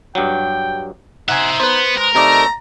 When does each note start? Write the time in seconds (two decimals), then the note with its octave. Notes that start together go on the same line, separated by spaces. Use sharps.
0.15 G2 F#3 G5
1.29 D#4 C5 E5 F#5 G#5
1.60 B3 B4 C5
1.97 G#3 A#4
2.15 C3 A3 D#4 D5 A#5